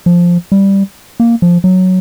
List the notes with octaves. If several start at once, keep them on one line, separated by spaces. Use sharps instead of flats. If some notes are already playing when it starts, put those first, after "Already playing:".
F3
G3
A#3
F3
F#3